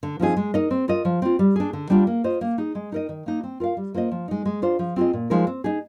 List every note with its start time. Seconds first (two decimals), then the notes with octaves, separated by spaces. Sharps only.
0.03 D3
0.20 F3 C4 D#4 G#4
0.37 G#3
0.54 D#4 A#4 D#5
0.71 C4
0.88 F4 A#4 D#5
1.05 F3
1.22 C4 F4
1.39 G3
1.56 D4 G#4
1.73 D3
1.90 G3 D4 F4
2.07 A#3
2.24 F4 C5 D#5
2.41 A#3
2.58 D#4 G#4
2.75 G#3
2.92 D#4 A#4 D#5
3.09 D#3
3.26 A#3 D#4
3.43 C4
3.60 F4 A#4 F5
3.77 G3
3.94 A#3 F4 C5 D#5
4.11 F3
4.28 G#3 D#4
4.45 G#3
4.62 D4 F4 C5
4.79 F3
4.96 C4 F4 G#4 D#5
5.13 A#2
5.30 F3 G#3 D#4 A#4
5.47 C4
5.64 D#4 G#4